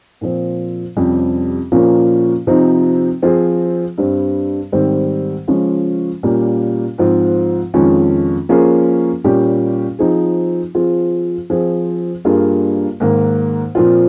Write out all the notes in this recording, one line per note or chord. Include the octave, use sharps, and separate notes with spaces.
A#2 F3 C4
F2 C3 G3 C#4 G4
A#2 F3 A#3 C#4
C3 F3 C4 D#4
F3 C4 F4 G#4
G2 G3 C4
G#2 D#3 G3 C4
C#3 F3 G#3 C#4 F4
A#2 G3 A#3 C#4
G#2 F3 C4 F4
F2 D#3 G#3 C#4 F4
F3 A#3 C#4 F4 G#4
A#2 G3 C#4 G4
F3 C4 D#4 G#4
F3 C4 F4 G#4
F3 C4 F4 G#4
G2 G3 A#3 F4 G#4
G#2 D#3 A#3
A#2 F3 C4 F4